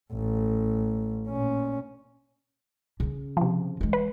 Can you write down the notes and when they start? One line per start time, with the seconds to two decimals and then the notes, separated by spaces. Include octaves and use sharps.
0.12 A1
1.29 A#2 C#4
3.00 C#3 C#4
3.37 C3 F3
3.81 E3 G#3
3.93 B4